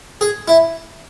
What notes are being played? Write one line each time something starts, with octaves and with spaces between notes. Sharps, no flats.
G#4
E4